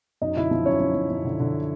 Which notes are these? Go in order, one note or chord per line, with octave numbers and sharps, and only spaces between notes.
F#2 D#4 D#5
D3 E4 E5
F3
F#2 C#4 C#5
F#2
F#2
F#2
D3
D3